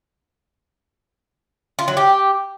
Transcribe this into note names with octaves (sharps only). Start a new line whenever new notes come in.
F4
F#3
G4